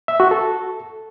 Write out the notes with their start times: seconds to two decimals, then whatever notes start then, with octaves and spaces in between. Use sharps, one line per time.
0.08 E5
0.20 F#4
0.31 A4